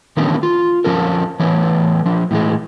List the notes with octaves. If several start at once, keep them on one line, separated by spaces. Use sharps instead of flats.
D#3 E3 A3 B3 C#4 D4
F4
F2 C#3 F3 C#4 A4 A#4
E3 A3 B3 C#5
F3 D4
A2 E3 G3 G#3